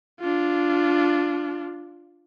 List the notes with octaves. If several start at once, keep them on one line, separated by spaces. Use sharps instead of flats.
D4 F4